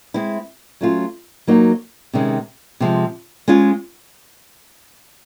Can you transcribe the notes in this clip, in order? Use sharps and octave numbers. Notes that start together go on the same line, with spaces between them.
G#3 C4 E4
F#3 A3 C#4 F4
F#3 A#3 D#4 F#4
C3 D#3 G#3 C#4
C3 F3 G#3
G#3 C#4 F4 G#4